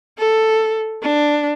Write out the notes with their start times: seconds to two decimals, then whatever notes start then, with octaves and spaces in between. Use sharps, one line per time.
0.18 A4
1.02 D4